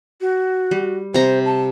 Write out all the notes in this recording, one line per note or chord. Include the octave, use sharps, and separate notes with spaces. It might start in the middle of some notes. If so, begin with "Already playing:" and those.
F#4
G3
C3 C5 A#5
A5